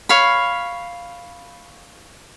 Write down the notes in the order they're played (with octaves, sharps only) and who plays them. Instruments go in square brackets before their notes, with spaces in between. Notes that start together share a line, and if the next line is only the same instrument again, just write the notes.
[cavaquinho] C#5 F5 B5